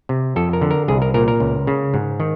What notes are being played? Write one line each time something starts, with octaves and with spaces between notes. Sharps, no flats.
C3
F2 A4
A#4
D3
A#4
C2 G#4
A#4
A#2 A#4
A#4
C#2
C#3
G#2
D#3